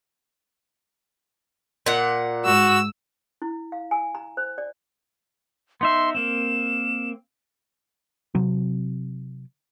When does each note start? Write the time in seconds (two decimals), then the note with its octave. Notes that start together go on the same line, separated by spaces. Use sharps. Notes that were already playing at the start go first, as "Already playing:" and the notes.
1.86 A#2 F#5
2.45 G#2 F#4 E6
3.42 E4
3.72 F5
3.91 G#5
4.15 A#5
4.37 C5
4.58 D5
5.81 B3 D#4 E5 C6
6.15 A#3 C4 E7
8.35 C3 F#3 C4